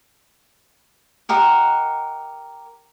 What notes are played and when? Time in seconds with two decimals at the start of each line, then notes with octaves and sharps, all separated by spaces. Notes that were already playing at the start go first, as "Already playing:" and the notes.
1.29 G4 A#4 D#5 F#5